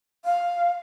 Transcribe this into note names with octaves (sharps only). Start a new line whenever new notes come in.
F5